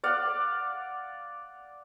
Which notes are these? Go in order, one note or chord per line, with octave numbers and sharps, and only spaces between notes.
D5 F5 F#5